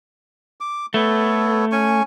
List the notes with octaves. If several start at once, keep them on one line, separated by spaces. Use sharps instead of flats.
D6
A3 B3 A4 C#5
C#4 G#5 C#6